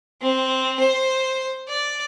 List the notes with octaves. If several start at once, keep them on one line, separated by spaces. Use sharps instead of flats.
C4
C5
D5